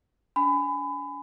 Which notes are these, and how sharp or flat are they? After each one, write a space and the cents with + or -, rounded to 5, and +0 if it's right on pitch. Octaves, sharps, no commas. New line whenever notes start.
D4 -45 G#5 +0 B5 +25